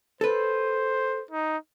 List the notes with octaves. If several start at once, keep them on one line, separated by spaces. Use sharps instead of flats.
A4 B4 C5
D#4